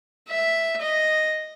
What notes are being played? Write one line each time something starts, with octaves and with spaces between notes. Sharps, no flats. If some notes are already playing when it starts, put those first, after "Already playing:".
E5
D#5